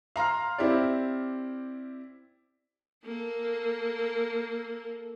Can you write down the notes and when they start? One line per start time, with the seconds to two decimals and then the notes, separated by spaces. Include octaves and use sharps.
0.16 F5 A#5 C6 F6
0.58 C4 E4 G4 D5
3.05 A#3 A4